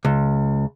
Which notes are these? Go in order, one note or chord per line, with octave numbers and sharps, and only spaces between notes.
C#2